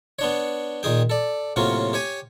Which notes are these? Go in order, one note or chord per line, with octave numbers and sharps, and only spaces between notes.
B3 D4 C#5
A#2 D#3 G#4 G5
A4 D5
A2 C3 F#3 A#3 C#4 F4
G4 C#5 G#5